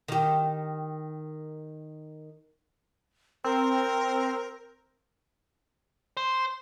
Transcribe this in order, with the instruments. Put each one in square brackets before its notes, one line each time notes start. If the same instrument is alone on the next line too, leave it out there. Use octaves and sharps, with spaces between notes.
[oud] D#3 G4
[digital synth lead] C4 [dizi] A#4
[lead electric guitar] C5